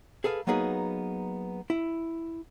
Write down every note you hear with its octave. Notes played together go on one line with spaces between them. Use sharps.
G#4 A4 B4 F5
F#3 A#3 B3 D#4 G#4 B4
E4